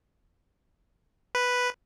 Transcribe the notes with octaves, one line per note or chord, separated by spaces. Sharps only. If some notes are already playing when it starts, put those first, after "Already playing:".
B4